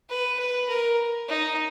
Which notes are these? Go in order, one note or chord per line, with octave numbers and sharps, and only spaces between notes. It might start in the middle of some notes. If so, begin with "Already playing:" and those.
B4
B4
A#4
D#4